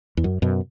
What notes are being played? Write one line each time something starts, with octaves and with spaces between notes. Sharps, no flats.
E2
F#2
F#2 B2